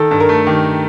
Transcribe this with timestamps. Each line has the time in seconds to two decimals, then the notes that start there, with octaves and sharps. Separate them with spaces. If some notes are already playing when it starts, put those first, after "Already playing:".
Already playing: D#3 A4
0.11 G2
0.20 A#4
0.29 A3
0.47 D#3 G4